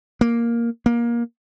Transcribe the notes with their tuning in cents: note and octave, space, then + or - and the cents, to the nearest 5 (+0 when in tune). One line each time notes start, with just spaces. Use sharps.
A#3 +5
A#3 +20